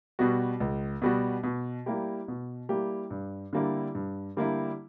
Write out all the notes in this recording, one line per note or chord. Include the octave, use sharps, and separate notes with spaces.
B2 G3 B3 F#4
C#2
B2 G3 B3 F#4
B2
G3 A#3 E4 G4
B2
G3 A#3 E4 G4
G2
D3 G3 A#3 E4
G2
D3 G3 A#3 E4